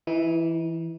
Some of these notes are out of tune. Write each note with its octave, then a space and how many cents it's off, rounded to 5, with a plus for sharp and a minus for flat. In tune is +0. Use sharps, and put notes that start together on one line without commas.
E3 +5 D#4 +45